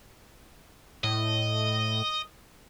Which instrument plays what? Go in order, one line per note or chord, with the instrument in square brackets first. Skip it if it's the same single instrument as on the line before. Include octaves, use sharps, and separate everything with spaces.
[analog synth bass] A2 [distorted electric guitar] D#5